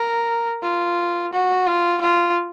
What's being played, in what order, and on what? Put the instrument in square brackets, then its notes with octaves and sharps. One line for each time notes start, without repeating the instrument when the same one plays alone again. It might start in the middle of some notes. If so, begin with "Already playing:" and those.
Already playing: [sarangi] A#4
F4
F#4
F4
F4